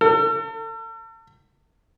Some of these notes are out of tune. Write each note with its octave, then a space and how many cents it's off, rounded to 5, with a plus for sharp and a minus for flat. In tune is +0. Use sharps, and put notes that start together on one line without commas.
A4 +40